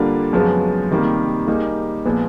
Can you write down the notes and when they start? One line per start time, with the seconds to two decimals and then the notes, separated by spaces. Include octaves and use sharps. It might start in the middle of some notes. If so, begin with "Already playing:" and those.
Already playing: D3 G3 A#3 D4 F4
0.33 F#2 C#3 F3 G#3 B3
0.90 C3 D#3 G3 A#3
1.47 G3 A#3 D#4 G#4
2.05 A#2 F3 G#3 B3